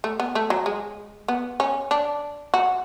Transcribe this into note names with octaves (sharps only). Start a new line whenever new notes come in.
A3
B3
A3
F#3
G#3
B3
C#4
D4
F#4